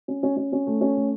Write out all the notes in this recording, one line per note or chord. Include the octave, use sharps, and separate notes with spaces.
C#4
C#4
C#4
C#4
A3
C#4
A3